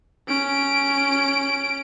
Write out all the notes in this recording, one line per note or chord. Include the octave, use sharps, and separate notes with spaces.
C#4 D7